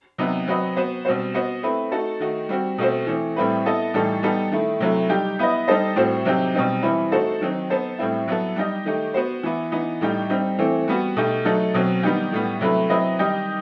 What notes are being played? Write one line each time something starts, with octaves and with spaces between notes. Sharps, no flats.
C3 F#3 B3 D#4
F#3 C4 F#4 B4 D#5
B3 F#4 C5
B2 G3 C4 F#4 C5
B3 F#4 C5 D#5
A3 C4 E4 B4
A3 D#4 F#4 A4
D#3 A3 D#4 F#4
G3 C4 F#4
B2 A3 C4 F#4 C5
E3 A3 C4
A2 G3 C4 E4 B4
B3 E4 A4 D#5
A2 E3 G3 D#4 A4
G3 B3 D#4 A4
D#3 A3 E4
C3 F#3 A3 E4
G3 D#4 G4
B3 E4 B4 D#5
G3 D#4 A4 C5 D#5
A2 G3 C4 F#4 C5
C3 F#3 C4 D#4 G4
B2 G3 C4 D#4
E3 G3 C4 E4 B4
A3 D#4 F#4 A4 C5
D#3 F#3 C4 D#4
B3 D#4 A4 C5
A2 G3 C4 E4
F#3 B3 E4 A4
G3 D#4 G4 D#5
D#3 A3 D#4 G4
B3 F#4 C5
E3 B3 E4
E3 B3 D#4
A2 G3 D#4 G4
G3 C4 D#4
E3 A3 C4
G3 B3 F#4
B2 A3 D#4 G4
F#3 A3 D#4 A4
B2 F#3 C4
D#3 G3 B3 D#4 G4
A2 G3 B3
C3 F#3 A3 E4 B4
F#3 C4 E4 B4 D#5
D#3 G3 D#4 G4 D#5